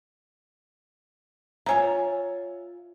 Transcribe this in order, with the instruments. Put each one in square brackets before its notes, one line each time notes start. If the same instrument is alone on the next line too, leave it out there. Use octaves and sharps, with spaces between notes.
[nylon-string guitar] F4 C#5 E5 [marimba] G#5 A#5